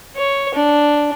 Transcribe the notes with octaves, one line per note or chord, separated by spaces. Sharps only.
C#5
D4